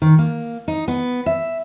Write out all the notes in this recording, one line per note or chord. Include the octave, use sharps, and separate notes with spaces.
D#3
A#3
D#4
B3
E5